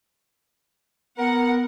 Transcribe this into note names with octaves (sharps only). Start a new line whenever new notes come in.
B3 A#4 F#5